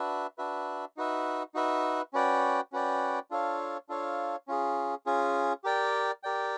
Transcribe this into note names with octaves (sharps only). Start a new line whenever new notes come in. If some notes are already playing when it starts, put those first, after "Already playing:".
Already playing: D4 F#4 B4 E5
D4 F#4 B4 E5
D#4 F#4 B4 E5
D#4 F#4 B4 E5
C#4 F#4 B4 D5 G5
C#4 F#4 B4 D5 G5
D4 F4 A4 C#5 F5
D4 F4 A4 C#5 F5
C#4 F4 G#4
C#4 F4 G#4
G4 A#4 D5 G5
G4 A#4 D5 G5